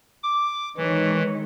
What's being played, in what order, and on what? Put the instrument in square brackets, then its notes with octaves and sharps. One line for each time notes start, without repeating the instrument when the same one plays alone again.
[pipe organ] D6
[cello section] D#3 G#3 C#5 [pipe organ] E3